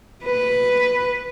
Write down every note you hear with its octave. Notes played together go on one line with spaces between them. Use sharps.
B4